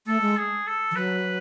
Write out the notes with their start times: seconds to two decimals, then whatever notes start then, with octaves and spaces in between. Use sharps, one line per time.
0.07 A3 A4
0.21 G#3
0.37 G#4
0.67 A4
0.91 E3
0.96 F#3 B4